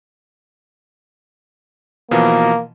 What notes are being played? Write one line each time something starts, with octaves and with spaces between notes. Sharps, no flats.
B2 E3 F3 A#3